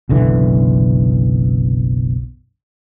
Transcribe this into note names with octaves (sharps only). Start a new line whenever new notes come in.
F#1 B1 D3 E3